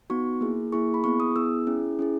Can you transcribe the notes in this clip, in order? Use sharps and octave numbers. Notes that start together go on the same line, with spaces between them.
B3 D#4 F#4 C#6
A#3 E4 G#4
A#3 E4 G#4 C#6
B5
B3 E4 G#4 C#6
D#6
B3 E4 G#4 E6
C#4 E4 G#4
C#4 E4 G#4